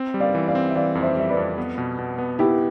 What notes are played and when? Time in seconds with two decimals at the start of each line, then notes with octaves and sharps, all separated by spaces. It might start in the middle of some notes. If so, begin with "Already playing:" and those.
Already playing: C4
0.14 G3
0.20 D5 F5
0.35 E3
0.48 D5 F5
0.55 C4
0.69 E5
0.75 E3 D5 F5
0.95 F2
1.02 C5 E5
1.17 G3 E5
1.30 B4 D5
1.37 F2
1.58 B3
1.78 B2
1.99 B2
2.18 B3
2.39 B3 E4 G4